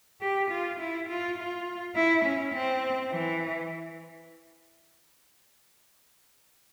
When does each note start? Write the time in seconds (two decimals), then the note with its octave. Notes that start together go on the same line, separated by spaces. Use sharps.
0.21 G4
0.50 F4
0.79 E4
1.08 F4
1.37 F4
1.95 E4
2.24 C#4
2.53 C4
3.11 E3